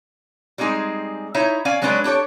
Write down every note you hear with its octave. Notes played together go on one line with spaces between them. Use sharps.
G3 G#3 C4 D#4 G#4
D#4 E4 C#5 E5
C#4 D5 F5 G#5
F#3 G#3 C#4 D4 A#4 B4
D4 G4 A4 C#5